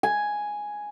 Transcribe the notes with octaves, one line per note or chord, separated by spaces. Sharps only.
G#5